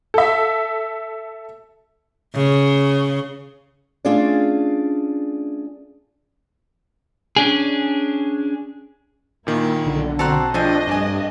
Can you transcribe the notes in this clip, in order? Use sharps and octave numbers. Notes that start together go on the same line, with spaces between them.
A4 E5
C#3
A3 C#4 D4 F4 G#4 D5
C#4 D4 G#4
A#2 D#3 A#3 E4
B1 D3
C4 F#4 A4 A#5 C6 F#6
F3 A3 C4 D4 G#4 D#5
G2 D4 D5 G#5